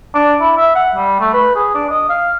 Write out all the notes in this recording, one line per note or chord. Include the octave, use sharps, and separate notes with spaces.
D4
E4
E5
F#5
G3
A3
B4
G#4
D4
D#5
F5